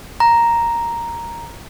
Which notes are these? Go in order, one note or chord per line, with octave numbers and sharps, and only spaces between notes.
A#5